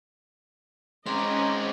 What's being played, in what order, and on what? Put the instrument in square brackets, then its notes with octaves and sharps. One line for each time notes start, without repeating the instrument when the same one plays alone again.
[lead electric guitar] G#3 C4 [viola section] C#4 D#5 [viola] C5 D6 [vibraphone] A#5 C6